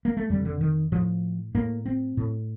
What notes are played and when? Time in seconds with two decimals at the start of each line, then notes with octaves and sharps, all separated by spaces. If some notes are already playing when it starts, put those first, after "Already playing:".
0.05 A#3
0.17 A3
0.30 F2 D3 G3
0.45 D3
0.61 D#3
0.92 A2 F3
1.55 A2 A#3
1.86 C4
2.17 A2